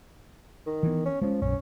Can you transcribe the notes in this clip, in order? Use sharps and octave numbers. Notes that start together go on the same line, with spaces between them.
D#3
E3 B3
C#4
F3 G#3 C#4
A#1 F#2 C#4